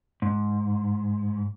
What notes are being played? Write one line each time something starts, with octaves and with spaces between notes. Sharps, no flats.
G#2